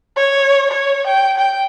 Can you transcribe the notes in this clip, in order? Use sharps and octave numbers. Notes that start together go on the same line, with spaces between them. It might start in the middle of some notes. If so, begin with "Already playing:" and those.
C#5
C#5
G5
G5